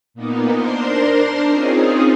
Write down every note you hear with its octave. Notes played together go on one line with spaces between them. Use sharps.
A#2 A#3 B3 D#4
D4 A#4 C5 C6
C4 C#4 D#4 F4 G#4